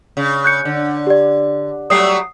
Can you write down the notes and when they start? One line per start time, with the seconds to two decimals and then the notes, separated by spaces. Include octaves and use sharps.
0.17 C#3
0.44 F#6 G6 C#7
0.65 D3
1.07 G4 D5
1.90 F#3 G3 A3 D#6 C7